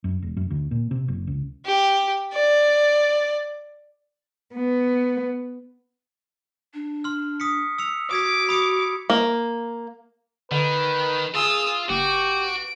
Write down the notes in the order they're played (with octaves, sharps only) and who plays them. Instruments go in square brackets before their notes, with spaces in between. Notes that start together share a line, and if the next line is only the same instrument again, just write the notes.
[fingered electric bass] F#2
E1
F#2
D2
A#2
C3
F#1
C#2
[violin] G4
D5
[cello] B3
[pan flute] D4
[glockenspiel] C6 F6
D#6 B6 C#7
E6 C#7 F7
[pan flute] F#4 [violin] D6 [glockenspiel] D#6 G#6 B6
[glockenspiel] B5 D#6 C#7
[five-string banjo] A#3
[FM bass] D3 [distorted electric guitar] D#3 [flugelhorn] B4
[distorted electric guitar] F4 [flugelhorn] G#4 [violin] D#6 E6
[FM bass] F#1 [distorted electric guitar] F#4 [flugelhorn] G4 [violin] D7